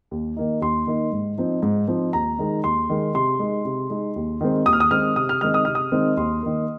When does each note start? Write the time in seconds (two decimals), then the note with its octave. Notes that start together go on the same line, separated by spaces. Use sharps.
0.11 D#2
0.36 D#3 A#3 D#4
0.61 D#2 C6
0.87 D#3 A#3 D#4
1.12 G#2
1.38 F3 C4 D#4
1.63 G#2
1.88 F3 C4 D#4
2.13 D#2 A#5
2.39 D#3 G#3 D#4
2.64 D#2 C6
2.90 D#3 G#3 D#4
3.14 C3 C6
3.39 G#3 D#4
3.65 C3
3.90 G#3 D#4
4.16 D#2
4.41 D#3 G#3 C4
4.66 D#2 D#6
4.73 F6
4.80 D#6
4.91 D#3 G#3 C4 F6
5.16 C3 D#6
5.29 F6
5.41 D#3 G#3 C4 D#4 F6
5.54 D#6
5.65 C3 F6
5.75 D#6
5.92 D#3 G#3 C4 D#4
6.17 D#2 C6
6.43 D#3 A#3